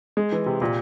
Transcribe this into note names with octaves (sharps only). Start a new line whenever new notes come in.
G#3
E3
C3
A#2